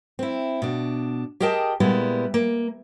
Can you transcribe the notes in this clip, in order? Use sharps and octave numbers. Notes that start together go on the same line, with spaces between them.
C4 E4
B2 D4
G4 G#4 A#4 D#5 G5 A5
A#2 G3 G#3 B3 E4
A#3